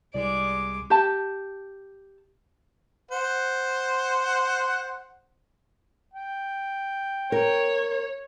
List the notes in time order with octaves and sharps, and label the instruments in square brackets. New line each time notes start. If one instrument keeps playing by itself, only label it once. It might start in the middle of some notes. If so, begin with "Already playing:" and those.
[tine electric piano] C2 [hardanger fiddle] G#3 D6 [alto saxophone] D5
[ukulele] G4 A5
[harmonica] C5 F#5
G5
[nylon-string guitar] A#4 [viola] C#5